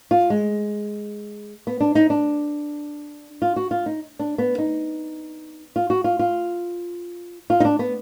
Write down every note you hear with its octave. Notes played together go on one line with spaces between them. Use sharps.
F4
G#3
B3
D4
D#4
D4
F4
F#4
F4
D#4
D4
B3
D#4
F4
F#4
F4
F4
F4
D#4
D4
B3